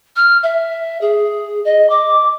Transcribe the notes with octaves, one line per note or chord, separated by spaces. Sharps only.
F6
E5
G#4
D#5
D6